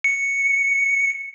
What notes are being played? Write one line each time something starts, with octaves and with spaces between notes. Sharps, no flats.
C#7